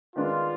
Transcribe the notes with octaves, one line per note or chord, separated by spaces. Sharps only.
D#3 G#3 B3 D4 F4